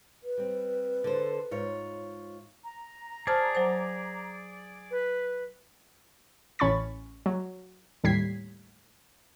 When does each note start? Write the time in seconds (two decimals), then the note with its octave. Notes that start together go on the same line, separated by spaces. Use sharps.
0.24 B4
0.38 G3 C4
1.04 D3 A4 C5
1.51 G#2 F4 C#5
2.64 A#5
3.27 G#4 C5 D5 A5 F6
3.55 F#3 C5
4.91 B4
6.59 A1 C#4 B5 C#6 A6
7.26 F#3
8.04 D#2 A2 G3 G#6 B6 C7